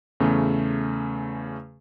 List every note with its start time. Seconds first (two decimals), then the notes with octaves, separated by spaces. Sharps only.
0.20 E2 C#3 A3